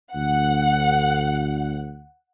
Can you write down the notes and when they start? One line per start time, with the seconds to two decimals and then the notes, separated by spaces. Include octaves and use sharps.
0.14 D2 F#5